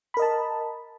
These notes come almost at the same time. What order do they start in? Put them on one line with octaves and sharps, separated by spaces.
B5 A#4 D#5 A5